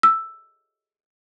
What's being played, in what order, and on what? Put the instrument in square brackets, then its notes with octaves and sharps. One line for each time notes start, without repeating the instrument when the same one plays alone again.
[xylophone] E6